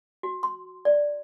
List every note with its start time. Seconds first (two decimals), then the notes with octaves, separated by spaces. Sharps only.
0.23 F#4
0.43 C6
0.85 D5